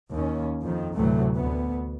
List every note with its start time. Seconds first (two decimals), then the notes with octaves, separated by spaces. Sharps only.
0.11 D#2 C#4
0.62 F2 D#3
0.96 D2 A2 C3 E3 F#3 A3
1.36 D2 B3